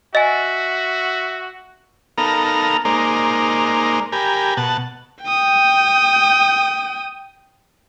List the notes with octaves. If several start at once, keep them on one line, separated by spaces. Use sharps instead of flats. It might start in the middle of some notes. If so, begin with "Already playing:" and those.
F#4 D#5 E5 G#5
B3 D#4 A4 A#4 F5 A#5
G#3 A#3 D#4 A#4 C5 D5
G4 A#4 G#5 B5
B2 F#5 A5
G5 D#6